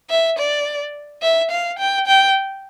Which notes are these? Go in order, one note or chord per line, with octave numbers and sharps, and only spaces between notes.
E5
D5
E5
F5
G5
G5